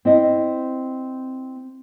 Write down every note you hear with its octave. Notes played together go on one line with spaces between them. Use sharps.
C4 E4 D#5